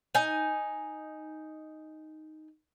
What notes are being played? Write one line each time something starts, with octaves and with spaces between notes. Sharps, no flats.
D#4 G#5